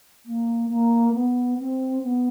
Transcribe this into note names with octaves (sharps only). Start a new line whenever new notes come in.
A#3
A#3
B3
C4
B3